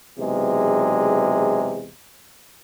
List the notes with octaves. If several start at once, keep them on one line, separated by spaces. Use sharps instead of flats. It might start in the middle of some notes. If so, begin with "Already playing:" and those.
B1 E2 C3 G#3